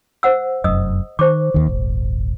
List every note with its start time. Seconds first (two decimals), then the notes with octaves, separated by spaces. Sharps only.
0.23 C5 F#5 E6
0.64 F1 F#2 D#5 D#6 E6
1.19 D#3 C5 C#6 D6
1.54 D#2 D#3
1.67 D#1 G#1